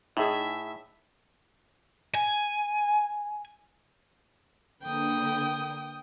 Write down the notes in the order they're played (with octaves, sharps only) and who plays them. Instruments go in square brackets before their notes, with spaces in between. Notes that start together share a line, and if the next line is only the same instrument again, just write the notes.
[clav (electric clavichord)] A2 [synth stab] D#4 E4 G#4 [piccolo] E5
[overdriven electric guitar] G#5
[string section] D3 A#3 B4 [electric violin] G5 D#6